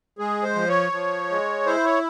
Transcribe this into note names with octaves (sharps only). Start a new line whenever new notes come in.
G#3 G#4
C5
F3
C#5
F3
G#3
E4 C5
C#5